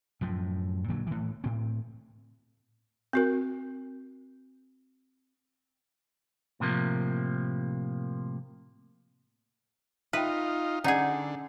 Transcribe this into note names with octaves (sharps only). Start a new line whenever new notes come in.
F#2 A2 F3
A#2 D3 F#3
A2 E3
A2 C4
C4 F#4 A#4
A2 C3 F3 A#3
D#4 F4 B4 E5 G5
D3 C#4 D#4 G#4 D5 F#5